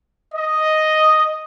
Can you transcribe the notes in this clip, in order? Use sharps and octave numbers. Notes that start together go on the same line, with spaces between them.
D#5